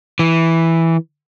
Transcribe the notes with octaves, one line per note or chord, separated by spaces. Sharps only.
E3